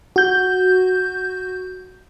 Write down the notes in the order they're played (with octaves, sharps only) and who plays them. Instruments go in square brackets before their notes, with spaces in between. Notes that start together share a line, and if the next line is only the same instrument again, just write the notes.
[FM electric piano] F#4 G6